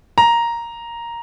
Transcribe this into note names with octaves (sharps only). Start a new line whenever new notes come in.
A#5